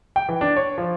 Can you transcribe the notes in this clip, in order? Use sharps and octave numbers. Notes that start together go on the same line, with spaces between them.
G5
E3
D4
C#5
F3